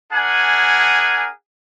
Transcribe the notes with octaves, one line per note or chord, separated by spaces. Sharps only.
D4 G#4 A#4 F#5 G#5